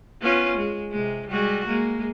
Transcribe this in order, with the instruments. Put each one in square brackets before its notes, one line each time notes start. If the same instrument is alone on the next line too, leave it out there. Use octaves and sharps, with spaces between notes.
[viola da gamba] B3 C#4 F4
G#3
C3 G#3
G3 G#3 F#4
G#3 A#3